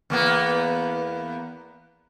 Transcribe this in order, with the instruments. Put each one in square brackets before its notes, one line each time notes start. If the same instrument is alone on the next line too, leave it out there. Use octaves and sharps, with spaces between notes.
[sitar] E2 A#3 B3